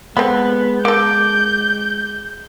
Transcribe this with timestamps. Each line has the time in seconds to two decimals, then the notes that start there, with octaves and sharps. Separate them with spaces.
0.17 G#3 B3 C4 A4 B5
0.85 A#3 A4 D6 G6